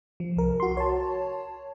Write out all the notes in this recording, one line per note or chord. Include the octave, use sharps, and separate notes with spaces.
F3
C2 A#4
F#4 C6
C#5 A5